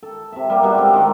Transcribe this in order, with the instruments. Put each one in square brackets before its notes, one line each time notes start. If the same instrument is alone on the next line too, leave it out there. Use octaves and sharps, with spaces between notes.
[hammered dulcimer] A4
C3 E5
G3 A#3 F#4
B2 G3 G#3 D4
C4 A4 F5
D#3 G#3 A3